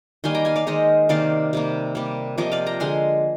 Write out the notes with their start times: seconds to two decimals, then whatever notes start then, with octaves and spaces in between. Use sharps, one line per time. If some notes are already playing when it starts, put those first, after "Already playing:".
0.24 D#3 G3 A#3 G#5 C6
0.35 G5 A#5
0.45 F5 G#5
0.56 D5 F5
0.67 D#3 G#3 C5 D#5
1.09 C3 D#3 A#3 D5 F5
1.53 C3 G3 A#3
1.95 C3 G3 A#3
2.38 C3 F3 A#3 D#5 G5
2.52 D5 F5
2.66 G5 A#5
2.80 D3 G#3 G#5 C6